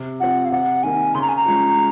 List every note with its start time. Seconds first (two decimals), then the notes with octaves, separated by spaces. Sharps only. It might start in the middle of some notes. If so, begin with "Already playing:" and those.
Already playing: C3
0.20 F3 C4 F#5
0.45 F5
0.52 C3 F#5
0.83 D#3 A#3 G#5
1.15 C#3 C6
1.22 A#5
1.29 G#5
1.36 A#5
1.46 F3 G#3 C#4